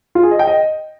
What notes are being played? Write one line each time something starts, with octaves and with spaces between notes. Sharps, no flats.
F4
G#4
D#5
G5
D#5